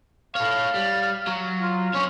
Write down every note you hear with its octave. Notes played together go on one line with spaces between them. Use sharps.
A4 C#5 F5
G3
F#3
F4
C4 C#4 C#5